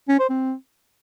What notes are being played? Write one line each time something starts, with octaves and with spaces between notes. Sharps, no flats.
C#4
C5
C4